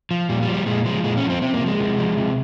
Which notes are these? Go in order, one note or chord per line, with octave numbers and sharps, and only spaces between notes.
F3
A#2 G3
G3
F3
G3
A#2 G#3
F3 G#3
A#2 G#3
C#4
F3
C4
C3 C4
A#3
F3
G#3
C3
F3
C3